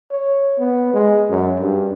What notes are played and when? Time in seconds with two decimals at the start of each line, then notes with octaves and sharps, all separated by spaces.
0.11 C#5
0.58 B3
0.94 G#3
1.30 F#2
1.60 G2